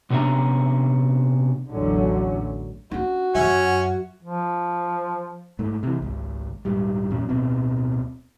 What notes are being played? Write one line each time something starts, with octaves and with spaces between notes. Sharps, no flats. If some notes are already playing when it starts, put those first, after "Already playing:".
C3 B3 C#4 D4 E5 A#5
A1 E2 D3 F#3 A3 C#4
C#4 D4 F#4
F#2 F#3 C#4 E5
F3
G#2 A3
C3 E3
G#1 C#2
D#1 G#2 G3
E2 A#2 F#3 C#4
D1 B2 B3 C4